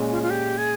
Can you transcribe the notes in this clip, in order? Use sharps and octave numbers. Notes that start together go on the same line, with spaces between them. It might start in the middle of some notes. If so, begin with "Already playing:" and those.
Already playing: A#2 G#3 C#4
F4
F4
G4
G#4